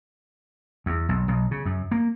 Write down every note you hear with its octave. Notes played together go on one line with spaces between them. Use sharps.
E2
B1
B1
C#3
F#2
A#3